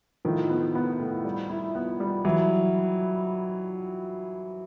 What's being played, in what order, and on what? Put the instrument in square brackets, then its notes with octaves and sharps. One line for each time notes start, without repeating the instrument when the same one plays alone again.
[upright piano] A2 [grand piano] D#3 F3
[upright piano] B3
B3
A2
G3
E4
B3
G3
[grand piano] E3 F#3